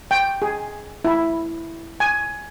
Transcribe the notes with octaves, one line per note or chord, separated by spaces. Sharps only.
G5
G#4
E4
G#5